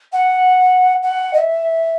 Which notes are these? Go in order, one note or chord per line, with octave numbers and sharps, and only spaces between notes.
F#5
F#5
D#5
E5